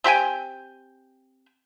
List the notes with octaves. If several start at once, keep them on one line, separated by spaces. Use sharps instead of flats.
C4 G4 G5 G#5